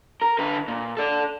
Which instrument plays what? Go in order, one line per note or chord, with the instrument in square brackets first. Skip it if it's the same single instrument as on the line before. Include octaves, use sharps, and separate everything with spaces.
[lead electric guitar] A#4
D3 B4
A#2
A4 D5